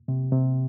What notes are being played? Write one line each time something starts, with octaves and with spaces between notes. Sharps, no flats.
C3
C3